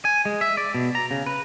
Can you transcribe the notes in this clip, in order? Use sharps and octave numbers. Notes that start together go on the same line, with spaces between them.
G#5
G#3
E5
D5
B2
A#5
C#3
B4